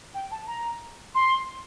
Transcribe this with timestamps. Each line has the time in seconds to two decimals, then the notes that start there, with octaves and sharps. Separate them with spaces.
0.14 G5
0.31 A5
0.47 A#5
1.15 C6